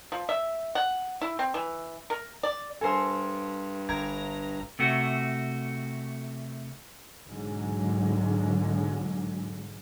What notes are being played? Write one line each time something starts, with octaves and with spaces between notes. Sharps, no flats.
F3
E5
F#5
E4
C4
E3
A#4
D5
G2 A4 A#4 C5 G#5
G1 A#4 A#5 G#6
C3 A3 F#4
B1 G#2 D3 F#3 G#3